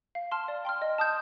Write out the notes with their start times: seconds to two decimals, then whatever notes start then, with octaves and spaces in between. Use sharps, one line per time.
0.15 F5
0.32 A5 C6 F6
0.48 D5
0.65 G5 C6 F6
0.82 D#5
0.98 A5 D#6 G6